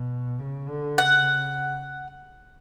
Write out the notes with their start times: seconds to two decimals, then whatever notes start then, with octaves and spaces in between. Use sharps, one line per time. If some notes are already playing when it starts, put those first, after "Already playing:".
Already playing: B2
0.39 C#3
0.69 D3
0.98 C#3 F#5